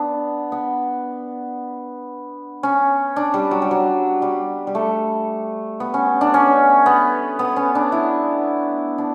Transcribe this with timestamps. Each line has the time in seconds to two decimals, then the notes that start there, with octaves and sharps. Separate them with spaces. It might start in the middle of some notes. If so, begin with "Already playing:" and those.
Already playing: B3 D4
0.52 B3
2.63 C#4
3.16 D4
3.34 G3
3.51 F#3
3.62 G3
3.71 F#3
4.22 G3
4.67 G3
4.75 A3
5.80 B3
5.94 C#4
6.21 D4
6.34 C#4
6.86 B3
7.39 B3
7.56 C#4
7.75 D4
7.92 E4
8.98 D4